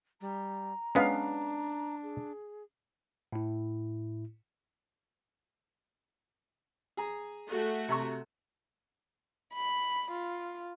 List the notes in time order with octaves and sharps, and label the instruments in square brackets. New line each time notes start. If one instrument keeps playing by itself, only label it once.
[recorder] G3 [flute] A#5
[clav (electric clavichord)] G#3 B3 [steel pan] C#4 B4 F5 [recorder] D4
[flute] G#4
[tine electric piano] A2 E4
[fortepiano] G#4 A#5
[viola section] A3 F#4
[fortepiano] C3 A#5 C#6
[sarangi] B5
F4